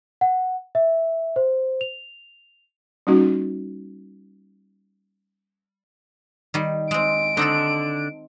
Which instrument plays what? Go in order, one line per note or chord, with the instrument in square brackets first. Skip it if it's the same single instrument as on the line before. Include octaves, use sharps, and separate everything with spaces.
[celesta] F#5
E5
C5
F7
[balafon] G3 A#3 C#4 D#4 F#4
[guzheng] D#3 G3
[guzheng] G#3 C4 [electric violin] D7
[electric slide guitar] D3 D4 [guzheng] C4 D#4 A4